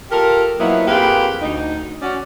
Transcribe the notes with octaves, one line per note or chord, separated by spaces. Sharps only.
F4 G4 A4 A#4
F3 F#3 A#3 B3 D#4 E4
F2 A#3 F4 G4 G#4 B4
D2 D#4
C#4 F#4 D5